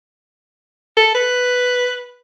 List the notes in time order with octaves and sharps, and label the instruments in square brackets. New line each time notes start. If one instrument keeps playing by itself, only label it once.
[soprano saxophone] A4
B4